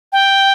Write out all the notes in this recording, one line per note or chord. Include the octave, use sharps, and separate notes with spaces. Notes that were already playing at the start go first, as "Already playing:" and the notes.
G5